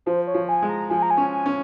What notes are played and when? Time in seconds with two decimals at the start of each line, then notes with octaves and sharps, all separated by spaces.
0.06 F3 C5
0.27 C#5
0.34 F3
0.49 G#5
0.62 G#3
0.69 A#5
0.90 F3 G#5
1.02 A#5
1.10 G#5
1.17 C#4
1.32 G#5
1.46 C#4